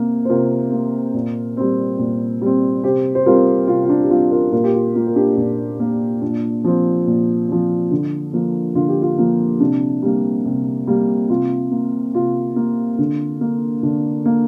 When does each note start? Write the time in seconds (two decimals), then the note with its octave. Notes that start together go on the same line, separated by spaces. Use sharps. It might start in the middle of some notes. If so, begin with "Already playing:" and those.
Already playing: C3 A#3
0.25 C5
0.29 C3 F4 A#4
0.72 A#3
1.14 A#2
1.57 G3 C4
1.99 A#2
2.42 G3 C4
2.84 C3 G4 C5
3.15 C5
3.26 G3 C4 F4 A#4
3.68 C3 F4
3.84 F4
3.89 D4
4.03 G4
4.10 G3 C4 F4
4.31 F4 A#4
4.52 A#2 F4 A#4
4.64 G4
4.74 F4
4.95 A#3 F4
5.07 A#4
5.16 D4 G4
5.37 A#2 D4
5.80 A#3
6.22 A#2 D4
6.64 F3 C4
7.07 A#2
7.48 F3 C4
7.91 D3
8.33 F3 A#3
8.75 D3 F4
8.88 G4
9.02 F4
9.18 F3 A#3
9.60 C3 D4
10.02 G3 A#3
10.46 C3
10.87 G3 A#3
11.30 C3 F4
11.71 A#3
12.14 C3 F4
12.56 A#3
12.98 D3
13.41 A#3
13.83 D3 D4
14.25 A#3